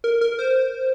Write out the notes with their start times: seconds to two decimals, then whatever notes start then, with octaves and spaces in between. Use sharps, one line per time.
0.04 A#4
0.21 A#4
0.39 C5